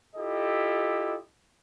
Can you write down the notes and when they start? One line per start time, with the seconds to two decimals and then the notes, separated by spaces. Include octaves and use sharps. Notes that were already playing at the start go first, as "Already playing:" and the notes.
0.16 E4 F4 G4 A4 D#5